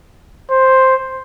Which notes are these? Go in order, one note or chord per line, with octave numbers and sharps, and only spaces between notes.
C5